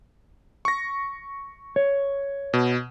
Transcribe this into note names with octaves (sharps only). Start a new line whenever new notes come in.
C#6 A#6
C#5
B2